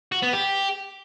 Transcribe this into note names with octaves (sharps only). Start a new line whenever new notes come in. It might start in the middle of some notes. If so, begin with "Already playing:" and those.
F#4
B3
G4